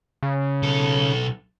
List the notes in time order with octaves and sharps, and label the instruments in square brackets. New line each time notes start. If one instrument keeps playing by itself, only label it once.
[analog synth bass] C#3
[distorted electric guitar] B1 A4